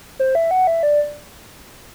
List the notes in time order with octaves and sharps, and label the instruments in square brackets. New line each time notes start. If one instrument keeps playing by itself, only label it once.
[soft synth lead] C5
E5
F#5
E5
D5